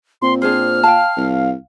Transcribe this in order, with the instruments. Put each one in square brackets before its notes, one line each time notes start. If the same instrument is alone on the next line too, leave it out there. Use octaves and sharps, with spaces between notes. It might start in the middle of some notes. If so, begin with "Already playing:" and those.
[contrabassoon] A#2 [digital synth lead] C4 [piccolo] C6
[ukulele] D4 G#4 C5 [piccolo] F6
[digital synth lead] F5 [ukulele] G5 A5
[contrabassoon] C2